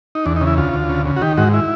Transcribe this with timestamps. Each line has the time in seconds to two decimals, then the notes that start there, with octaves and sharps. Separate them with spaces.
0.15 D#4
0.26 E2 D4
0.36 D#4
0.41 C#3
0.47 E4
0.57 D2 F4
0.73 D2
0.89 C#3
1.05 C#3
1.17 F#4
1.21 D#3 G4
1.37 G#2 F#4
1.54 E4